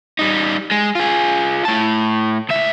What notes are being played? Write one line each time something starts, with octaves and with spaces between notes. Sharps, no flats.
G3 D#4
G#3
F4 G#4
A2 A5
C#2 E5